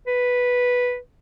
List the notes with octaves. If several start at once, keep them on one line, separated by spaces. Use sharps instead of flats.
B4